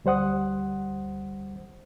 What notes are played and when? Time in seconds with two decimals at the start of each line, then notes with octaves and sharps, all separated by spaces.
0.05 D2 G3 C5 F#5 D#6